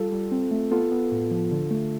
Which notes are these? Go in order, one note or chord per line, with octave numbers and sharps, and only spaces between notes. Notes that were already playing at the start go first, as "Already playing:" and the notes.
Already playing: G3 F4 A4
G3
C4
A3
B3 F4 A4
B3
A2
F3
D3
A3